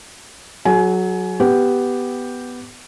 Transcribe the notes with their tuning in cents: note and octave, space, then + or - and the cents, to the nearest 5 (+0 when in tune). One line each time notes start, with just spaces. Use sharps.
F#3 +0 G#4 +40 G#5 +25
B3 +5 G4 +0